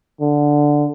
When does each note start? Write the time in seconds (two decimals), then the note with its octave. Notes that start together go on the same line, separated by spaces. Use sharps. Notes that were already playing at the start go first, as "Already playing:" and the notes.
0.21 D3